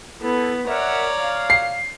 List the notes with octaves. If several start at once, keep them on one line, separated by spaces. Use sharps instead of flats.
B3 E4 A4
A#4 C#5 D5 E5 F#5 A#5
F5
C7